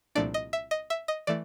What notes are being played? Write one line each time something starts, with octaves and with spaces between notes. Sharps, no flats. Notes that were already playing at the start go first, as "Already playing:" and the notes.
C2 A#2 F3 A3 D4 D5
D#5
E5
D#5
E5
D#5
E3 A3 D5